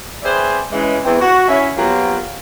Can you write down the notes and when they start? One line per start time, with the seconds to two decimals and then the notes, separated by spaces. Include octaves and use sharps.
0.23 C4 G#4 B4 C5 D5 E5
0.72 C#3 E3 G#3
1.04 E2 E3 C4
1.21 F#4
1.48 C#4 E4 E5
1.77 F3 F#3 A#3 B3 F4 G4